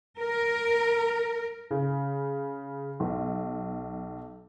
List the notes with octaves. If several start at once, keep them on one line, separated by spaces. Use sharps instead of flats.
A#4
C#3
B1